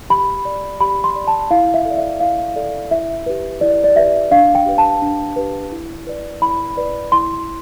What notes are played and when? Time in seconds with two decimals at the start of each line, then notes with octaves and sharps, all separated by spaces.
0.10 G4 B5
0.45 D5
0.81 G4 B5
1.04 C6
1.16 D5
1.28 A5
1.51 E4 F5
1.74 E5
1.85 A4
1.90 D5
1.97 E5
2.20 E4 F5
2.56 A4 D5
2.91 E4 E5
3.26 G4 B4
3.61 E4 D5
3.84 D5
3.96 G4 B4 E5
4.31 D4 F5
4.55 G5
4.66 G4 B4
4.78 A5
5.02 D4
5.36 G4 B4
5.72 E4
6.07 B4 D5
6.42 E4 B5
6.77 B4 D5
7.12 E4 C6